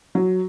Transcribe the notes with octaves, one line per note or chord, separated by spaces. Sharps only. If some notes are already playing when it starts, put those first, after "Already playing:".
F#3